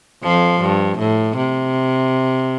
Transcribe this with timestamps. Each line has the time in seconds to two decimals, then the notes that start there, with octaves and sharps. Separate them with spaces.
0.23 F2 F3
0.61 G2
0.99 A2
1.37 C3